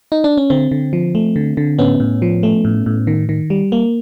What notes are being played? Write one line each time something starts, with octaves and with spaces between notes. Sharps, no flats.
D#4
D4
C#4
D3 C4
D3
F3
A3
D3
D3
A2 B3 C#4
A2
F3
A3
A2
A2
D#3
D#3
G3
A#3